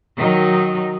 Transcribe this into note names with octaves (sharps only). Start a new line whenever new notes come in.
D#3 F#3 D#4